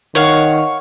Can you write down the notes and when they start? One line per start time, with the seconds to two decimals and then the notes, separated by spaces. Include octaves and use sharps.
0.15 D#3 C#5 F5 F#5